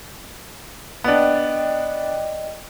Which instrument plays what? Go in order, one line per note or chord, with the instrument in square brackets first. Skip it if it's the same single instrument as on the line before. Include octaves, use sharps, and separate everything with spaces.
[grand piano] B3 D4 [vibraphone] D5 D#5 G5